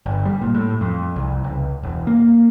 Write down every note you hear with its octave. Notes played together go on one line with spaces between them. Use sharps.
G1
G3
A#2
A2
F2
C2
C#2
E1
A#3